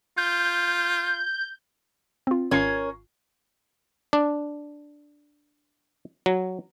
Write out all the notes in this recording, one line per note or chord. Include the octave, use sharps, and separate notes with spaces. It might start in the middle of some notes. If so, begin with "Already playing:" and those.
F4 G6
C4 F4
G#1 C#4 F4 A#4 C#5 C7
D4
F#3